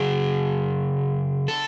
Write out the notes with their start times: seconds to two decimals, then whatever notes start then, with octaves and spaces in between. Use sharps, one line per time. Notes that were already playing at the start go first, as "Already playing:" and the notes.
Already playing: C#3 F#3 G#4
1.48 A4